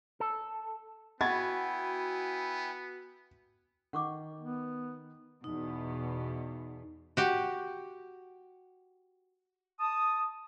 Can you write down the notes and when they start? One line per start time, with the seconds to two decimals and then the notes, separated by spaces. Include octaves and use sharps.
0.20 A4
1.21 B3 E4 F#4 G5 G#5 B5 G#6 A6
3.93 D#3 F#5 C#6 D6
4.41 B3
5.44 E2 B2 D#4
7.17 F#4 G4
9.79 A5 D#6